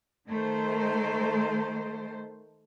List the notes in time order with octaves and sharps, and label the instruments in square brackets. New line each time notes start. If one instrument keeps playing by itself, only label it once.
[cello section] D#3 A3 C5